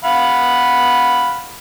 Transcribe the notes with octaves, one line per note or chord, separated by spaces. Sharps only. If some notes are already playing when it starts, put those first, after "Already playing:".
F5 F#5 B5